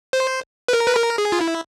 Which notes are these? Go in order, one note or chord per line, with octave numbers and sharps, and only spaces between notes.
C5
B4
A#4
B4
A#4
G#4
F4
E4